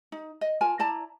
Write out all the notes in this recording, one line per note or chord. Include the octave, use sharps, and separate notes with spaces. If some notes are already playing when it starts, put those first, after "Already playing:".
D#4
D#5
F4 A#4 G#5 A5
E4 D5 A5 A#5